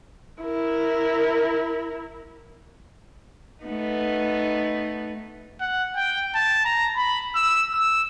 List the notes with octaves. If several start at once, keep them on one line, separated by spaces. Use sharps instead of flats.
E4 A#4
A3 B3 D#4
F#5
G5
A5
A#5
B5
E6
E6